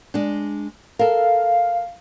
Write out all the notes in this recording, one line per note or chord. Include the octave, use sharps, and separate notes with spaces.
G#3 D4
A4 A#4 F5